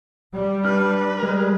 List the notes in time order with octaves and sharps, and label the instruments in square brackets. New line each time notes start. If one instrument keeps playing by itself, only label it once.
[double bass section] G3
[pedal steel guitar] D4 F6 [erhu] B4
[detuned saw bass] G3 [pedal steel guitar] G#3 A#4